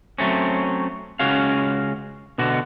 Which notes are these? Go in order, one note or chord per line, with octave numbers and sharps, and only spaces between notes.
F#3 A3 C4 C#4
C#2 C#4 F#4 G#4 F5
B2 D3 F#4